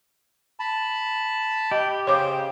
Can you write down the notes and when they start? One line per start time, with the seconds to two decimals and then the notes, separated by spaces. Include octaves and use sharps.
0.60 A5 B5
1.71 G4 D#5
2.07 C#3 C5 C#5 D6